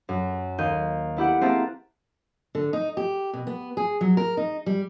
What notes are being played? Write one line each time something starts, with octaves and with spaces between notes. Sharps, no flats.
F#2
D#2 G6 D#7
B3 E4 G4 F#5
A#3 C4 G#4 E5 A5 A#5
D3
D#4
G4
B2
B3
G#4
F#3
A#4
D#4
G3